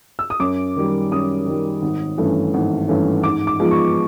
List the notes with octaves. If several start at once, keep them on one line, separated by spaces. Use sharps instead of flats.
E6
D#6
F#2 D6
D#3 G3
F#2 D#6
D#3 G3
G#1
G2 E3 A3 C#4
G#1
G2 E3 A3 C#4
G#2 D6
D6
F3 G#3 B3
C#6